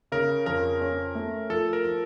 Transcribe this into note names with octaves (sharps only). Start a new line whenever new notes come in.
C#3 A#4
F2 A#4
C#4
A3
F3 A4
A#4
F3